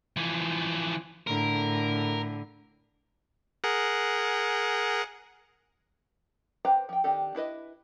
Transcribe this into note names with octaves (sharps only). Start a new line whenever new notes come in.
E3 F3
A2 D3 A#4
G#4 A#4 F#5
B4 C5 G5 A#5
F3 G5
D#3 C4 D4 G4 A4
D4 E4 B4 D#5